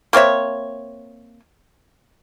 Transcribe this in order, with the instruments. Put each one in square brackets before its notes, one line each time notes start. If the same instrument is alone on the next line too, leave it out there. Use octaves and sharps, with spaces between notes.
[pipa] A#3 C4 C#5 E5